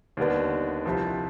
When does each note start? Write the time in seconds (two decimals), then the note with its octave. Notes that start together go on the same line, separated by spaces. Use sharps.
0.17 D#2 D3 G3 B3 D4
0.86 C2 C3 F3